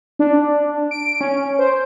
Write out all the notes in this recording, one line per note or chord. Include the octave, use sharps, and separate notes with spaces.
D4
D7
C#4
C5